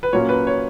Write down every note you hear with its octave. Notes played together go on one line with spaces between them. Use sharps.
B4
A#2 F#3 A#3 C#4 C#5
B4
C#5